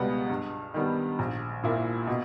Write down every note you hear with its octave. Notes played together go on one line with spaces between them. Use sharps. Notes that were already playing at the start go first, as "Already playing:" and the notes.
Already playing: C#2 B2 G3 B3
G2
D#3 G3 B3
A#1
A#2 A#3 E4
B2